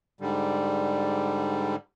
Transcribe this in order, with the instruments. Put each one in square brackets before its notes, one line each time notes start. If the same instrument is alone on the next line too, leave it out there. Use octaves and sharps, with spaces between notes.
[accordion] G#2 D3 G3